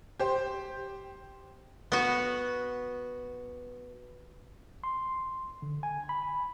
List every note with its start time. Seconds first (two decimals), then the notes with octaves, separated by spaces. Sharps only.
0.20 G4 C5
1.92 B3 F#4
4.84 C6
5.62 D3
5.83 G#5
6.09 B5